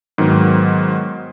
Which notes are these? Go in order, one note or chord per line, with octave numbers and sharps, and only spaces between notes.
G#2 D#3 F#3 B3